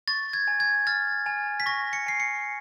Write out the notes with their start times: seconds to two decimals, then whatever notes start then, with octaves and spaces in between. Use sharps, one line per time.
0.08 C#6 A6
0.33 G#6
0.48 G#5
0.60 G#6
0.87 F6 A6
1.26 G#5
1.60 B6
1.66 C#6 A#6
1.93 C#7
2.06 G#5 C7
2.20 C#7